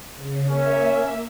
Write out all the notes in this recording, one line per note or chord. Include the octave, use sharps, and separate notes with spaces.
C#3
A#3 C#4 E5